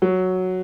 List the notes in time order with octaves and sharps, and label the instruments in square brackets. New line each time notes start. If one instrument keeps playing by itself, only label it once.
[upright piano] F#3